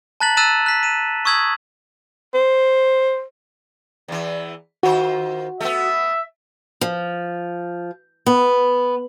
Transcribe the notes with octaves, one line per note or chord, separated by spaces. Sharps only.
A5 A#5 F#6 A6 B6 F#7
E6 F#6 A6 B6 D#7 E7
F#6 B6
D#7 E7
C#6 D#6 E6 G#6 B6 F#7
C5
E2 E3
D#3 F4 F#4 C5
A3 B3 E5
F3
B3